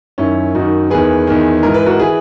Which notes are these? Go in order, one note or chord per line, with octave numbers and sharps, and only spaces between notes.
F#2 D#3 C#4 E4
F#2 D#3 D#4 F#4
E2 D#3 G#4 B4
E2 D#3
G#2 E3 A#4
B4
F#4 A#4
E3 G#4 B4